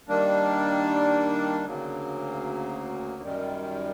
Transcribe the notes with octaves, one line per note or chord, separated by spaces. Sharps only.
D#3 G3 A#3 D4
D2 C#3 F#3 A#3
F#2 D#3 G3